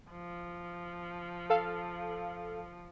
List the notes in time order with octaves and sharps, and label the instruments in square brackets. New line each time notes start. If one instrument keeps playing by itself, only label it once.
[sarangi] F3
[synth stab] A4 F5